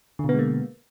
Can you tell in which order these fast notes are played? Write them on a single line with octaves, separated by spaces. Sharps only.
D3 B2 B3 G#3 A#3